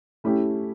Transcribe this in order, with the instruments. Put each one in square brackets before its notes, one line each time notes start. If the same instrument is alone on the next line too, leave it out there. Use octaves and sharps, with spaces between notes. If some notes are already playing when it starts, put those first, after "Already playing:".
[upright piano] A3 C#4 E4 G4